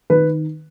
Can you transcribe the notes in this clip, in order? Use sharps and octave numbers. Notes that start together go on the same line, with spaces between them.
D#3 B4